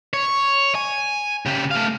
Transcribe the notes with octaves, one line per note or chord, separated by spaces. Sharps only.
C#5
G#5
C#3 G4
A3 F5